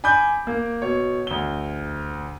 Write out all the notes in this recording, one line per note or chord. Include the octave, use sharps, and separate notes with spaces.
G#5 B5 D6 G6
A#3
B2 C#5
D2 G7